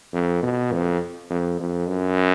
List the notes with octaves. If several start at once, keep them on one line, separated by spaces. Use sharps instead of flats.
F2
B2
F2
F2
F2
F#2